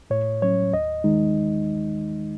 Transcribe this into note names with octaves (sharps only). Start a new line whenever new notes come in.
A2 C#5
F#3 C#4 C#5
D#2 D#5
D#3 G#3 D#4